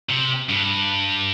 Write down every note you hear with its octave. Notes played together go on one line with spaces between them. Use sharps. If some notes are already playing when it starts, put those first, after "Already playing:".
C3
G2